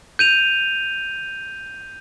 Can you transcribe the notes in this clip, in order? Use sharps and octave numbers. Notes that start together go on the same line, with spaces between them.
G6 D#7 F7